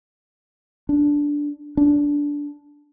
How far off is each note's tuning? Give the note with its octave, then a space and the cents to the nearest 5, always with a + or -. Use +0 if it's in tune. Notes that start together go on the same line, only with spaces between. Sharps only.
D4 -10
D4 -15